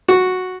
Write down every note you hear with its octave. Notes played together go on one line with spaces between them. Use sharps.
F#4